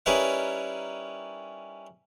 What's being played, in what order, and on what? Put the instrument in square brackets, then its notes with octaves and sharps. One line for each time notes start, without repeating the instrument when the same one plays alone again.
[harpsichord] G3 C#4 D#4 E4 A#4 B4